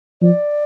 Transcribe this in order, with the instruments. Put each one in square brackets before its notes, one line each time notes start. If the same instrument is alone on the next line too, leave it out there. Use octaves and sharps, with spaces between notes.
[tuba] F3 [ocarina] D5